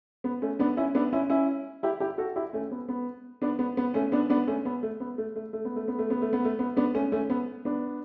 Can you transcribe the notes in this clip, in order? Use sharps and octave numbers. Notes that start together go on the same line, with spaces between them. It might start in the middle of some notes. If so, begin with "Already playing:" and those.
B3
A3 C#4
B3 D4
C#4 E4
B3 D4
C#4 E4
C#4 E4
E4 G4
E4 G4
F#4 A4
E4 G4
A3 C#4
B3
B3
B3 D4
B3
B3
A3 C#4
B3 D4
B3 D4
A3 C#4
B3
A3
B3
A3
A3
A3
B3
A3
B3
A3
B3
A3
B3
A3
B3
B3 D4
A3 C#4
A3 C#4
B3
B3 D4